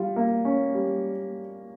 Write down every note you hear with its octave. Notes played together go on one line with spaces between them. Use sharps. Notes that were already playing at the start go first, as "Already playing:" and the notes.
Already playing: G3 F4
A#3
C#4
G3